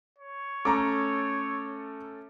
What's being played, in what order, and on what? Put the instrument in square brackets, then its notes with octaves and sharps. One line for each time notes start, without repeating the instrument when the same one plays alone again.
[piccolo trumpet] C#5
[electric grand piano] A3 C#4 A4 [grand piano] A#5 D6